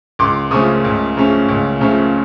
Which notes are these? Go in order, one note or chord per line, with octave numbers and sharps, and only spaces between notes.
C#2 C6 D6
C#3 F3 A3 C#4 C#6 D#6
C#2
C#3 F3 A3 C#4
C#2
C#3 F3 A3 C#4